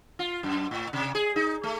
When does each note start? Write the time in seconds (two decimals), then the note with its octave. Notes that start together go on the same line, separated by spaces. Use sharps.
0.19 F4
0.43 F#2
0.71 A2
0.93 C3
1.15 G#4
1.36 D#4
1.63 A3